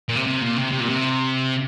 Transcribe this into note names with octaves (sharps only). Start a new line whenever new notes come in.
A#2
C3
C3
A#2
C3
C3
A#2
C3